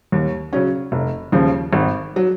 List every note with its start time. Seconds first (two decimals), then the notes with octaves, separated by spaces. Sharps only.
0.12 D#2
0.53 C#3 F#3 C#4
0.92 F1
1.32 D#2 C#3 F3
1.73 G#1
2.16 F#3